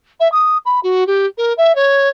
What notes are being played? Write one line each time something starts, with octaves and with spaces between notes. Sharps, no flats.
E5
D#6
B5
F#4
G4
A#4
E5
C#5